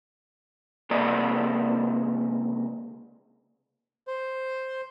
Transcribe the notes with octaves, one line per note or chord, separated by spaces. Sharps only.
C#2 C3 A#3 G#4 D5 D#5
C5